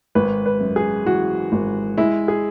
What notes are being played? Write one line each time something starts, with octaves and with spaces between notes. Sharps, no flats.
G#1 B4
B4
F#2
G#4
E3 F#4
G#1
G#3 E4
G#4